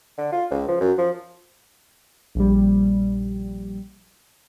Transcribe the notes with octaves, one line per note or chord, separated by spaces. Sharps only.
D3
F4
C#2
F3
F#2
F3
A#1 G3